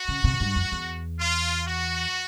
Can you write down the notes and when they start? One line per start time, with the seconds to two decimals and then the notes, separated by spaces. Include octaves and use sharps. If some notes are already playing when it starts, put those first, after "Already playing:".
Already playing: F#4
0.08 C#3
0.24 C3
0.40 G2
0.56 F2
0.72 E2
1.19 F4
1.67 F#4